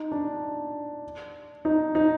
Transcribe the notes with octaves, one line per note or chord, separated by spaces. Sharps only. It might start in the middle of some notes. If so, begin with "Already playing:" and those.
Already playing: D#4
D4
D#4
D#4